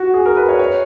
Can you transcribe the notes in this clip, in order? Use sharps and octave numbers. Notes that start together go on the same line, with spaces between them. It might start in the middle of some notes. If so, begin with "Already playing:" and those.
Already playing: F#4
G#4
A#4
B4
C#5
C#5